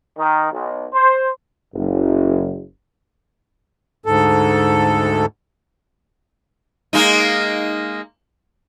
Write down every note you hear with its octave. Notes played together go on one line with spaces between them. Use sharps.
D#3
B1
C5
F#1
D2 G#2 A4
G#3 A#3 D#4